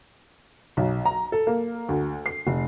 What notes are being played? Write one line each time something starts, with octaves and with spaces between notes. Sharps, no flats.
B1
A#5
A4
A#3
D2
C7
F1